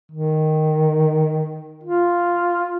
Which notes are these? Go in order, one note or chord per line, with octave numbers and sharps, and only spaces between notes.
D#3
F4